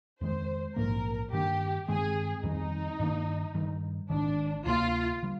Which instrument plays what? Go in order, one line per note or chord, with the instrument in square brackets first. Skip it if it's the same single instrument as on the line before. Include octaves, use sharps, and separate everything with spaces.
[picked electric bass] F2 D#3 G#3 [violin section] C5
[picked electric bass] A#1 G#2 F3 A#3 [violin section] A#4
[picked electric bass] G2 D#3 A#3 D4 [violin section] G4
[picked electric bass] G2 D#3 G#3 C4 [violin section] G#4
[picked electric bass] F2 D#3 G3 C4 [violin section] D#4
[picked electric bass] G2 D#3 A#3 D4
G2 D#3 G3
[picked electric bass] G#1 G#2 D#3 [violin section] D4
[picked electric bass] D2 C3 F3 A#3 [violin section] F4
[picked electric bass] D3 G3